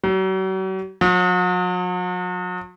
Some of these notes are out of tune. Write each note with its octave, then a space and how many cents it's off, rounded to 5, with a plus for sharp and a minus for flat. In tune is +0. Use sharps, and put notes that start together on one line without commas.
F#3 +40
F#3 -45